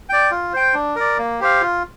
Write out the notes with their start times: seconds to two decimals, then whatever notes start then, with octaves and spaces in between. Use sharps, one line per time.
0.09 D5 G5
0.31 F4
0.53 C5 G5
0.74 D4
0.96 A#4 D5
1.18 A#3
1.40 G4 C5 F5
1.61 F4